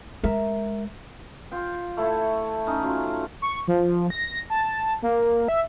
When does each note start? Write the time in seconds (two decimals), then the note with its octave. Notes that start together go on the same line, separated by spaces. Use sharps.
0.24 G#3 A#4 E5
1.51 F4 F5 G5
1.97 A3 E4 A4 C#5
2.67 C#4 D#4
2.83 F#3 C#4 F4
3.42 C#6
3.68 F3
4.10 A#6
4.50 A5
5.02 A#3
5.48 E5